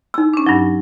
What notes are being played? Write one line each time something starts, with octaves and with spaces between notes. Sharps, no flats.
D#4 E6
C#4 D4
G2 F#3 D#4